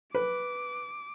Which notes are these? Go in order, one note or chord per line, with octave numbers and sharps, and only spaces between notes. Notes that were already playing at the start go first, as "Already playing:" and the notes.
B4 D6